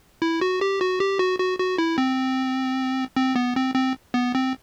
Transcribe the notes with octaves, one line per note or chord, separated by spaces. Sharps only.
E4
F#4
G4
F#4
G4
F#4
F#4
F#4
E4
C4
C4
B3
C4
C4
B3
C4